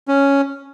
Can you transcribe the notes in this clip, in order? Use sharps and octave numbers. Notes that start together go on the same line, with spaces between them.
C#4